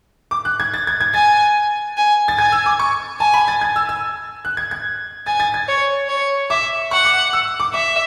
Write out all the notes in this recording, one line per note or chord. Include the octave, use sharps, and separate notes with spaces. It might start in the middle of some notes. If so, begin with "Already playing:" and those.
D6
F#6
G#6
A6
G#6
G#6
G#5 A6
G#5
A6
G#5 G#6
E6
D6
C#6
G#5 A5
B5
A6
G#6
E6
E6
F#6
G#6
G#6
G#5 A6
A6
G#6
C#5
C#5
E5 D6
F#5 C#6
D6
E6
D6
E5 D6